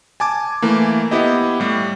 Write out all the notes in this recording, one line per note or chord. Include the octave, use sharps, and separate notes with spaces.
G#5 A5 D6 G#6
E3 A3 A#3
B3 E4 G4 D#5
A2 G3